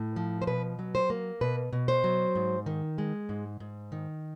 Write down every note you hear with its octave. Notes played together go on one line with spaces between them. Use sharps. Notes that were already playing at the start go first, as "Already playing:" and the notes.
Already playing: A2
F3
C5
B2 B4
F#3
C5
A#3
B2 B4
B2
C5
F#3
G#2
D#3
G#3
G#2
G#2
D#3